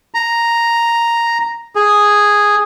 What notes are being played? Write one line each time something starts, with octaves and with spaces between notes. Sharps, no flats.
A#5
G#4